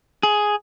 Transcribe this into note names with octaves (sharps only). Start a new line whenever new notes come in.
G#4